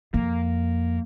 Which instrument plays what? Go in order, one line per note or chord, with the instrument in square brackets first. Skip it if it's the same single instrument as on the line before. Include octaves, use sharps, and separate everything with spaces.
[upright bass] F2 [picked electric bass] A#3